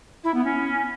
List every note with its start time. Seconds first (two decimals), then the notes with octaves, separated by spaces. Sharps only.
0.24 E4
0.34 B3
0.44 C#4